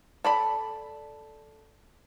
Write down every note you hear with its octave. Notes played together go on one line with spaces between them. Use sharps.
A4 D5 B5